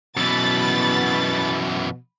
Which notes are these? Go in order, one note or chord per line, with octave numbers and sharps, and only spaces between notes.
F#2 B2 E3 B5 A6